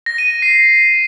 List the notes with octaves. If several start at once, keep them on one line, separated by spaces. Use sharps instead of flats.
A#6
D#7
D#7
C7